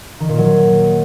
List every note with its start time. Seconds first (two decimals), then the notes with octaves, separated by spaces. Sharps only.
0.20 D#3
0.29 A#2
0.38 F#3